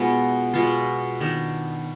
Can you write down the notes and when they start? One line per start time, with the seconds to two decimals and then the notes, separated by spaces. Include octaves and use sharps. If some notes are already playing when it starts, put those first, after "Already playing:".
Already playing: B2 G#3 B3 D#4 F4
0.53 B2 G#3 B3 F4
1.20 D#3 B3 D4